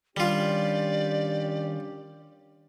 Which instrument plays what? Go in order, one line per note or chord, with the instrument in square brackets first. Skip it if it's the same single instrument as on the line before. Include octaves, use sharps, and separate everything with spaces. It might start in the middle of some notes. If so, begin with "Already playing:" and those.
[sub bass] D#3 [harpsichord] G3 F4 [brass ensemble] C#4 D4 G4 [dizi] D5